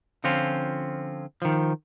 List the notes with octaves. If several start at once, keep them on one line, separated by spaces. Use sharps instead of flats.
D3 F3 C4 C#4 F4
D#3 F3